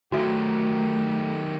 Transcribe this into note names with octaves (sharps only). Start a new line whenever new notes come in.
D#3 F#3 A3 F#4 G4 E5